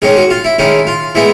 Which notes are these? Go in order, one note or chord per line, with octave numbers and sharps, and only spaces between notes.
D#3 G#3 C#4 G#4
F#4
F4
E4
D#3 G#3 C#4 E4
F4
E3 G#3 B3 E4